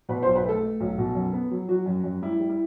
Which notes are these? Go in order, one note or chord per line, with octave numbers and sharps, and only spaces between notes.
B2 B4
B1 C5
B4
A3 A4
A3
B1
B2
F#2
B3
F#3
F#3 F#4
F#2
F#2
G3 E4
G3
E4